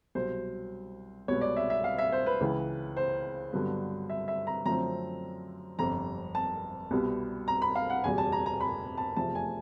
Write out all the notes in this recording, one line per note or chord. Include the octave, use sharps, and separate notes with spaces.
C2 B2 F#3 C5
C2 B2 G#3 B3 C#5
D5
E5
E5
F5
E5
C5
B4
C#2 C#3 E3
C5
G2 D3 F#3 B3
E5
E5
A#5
F#2 D3 F3 A3 C4 A#5
G1 F2 C3 A#5
A5
C2 B2 G3 B3
A#5
B5
F5
F#5
F#1 E2 B2 G3 G#5
A5
A#5
A#5
B5
A5
F1 E2 C3 F3 A3 A5
G#5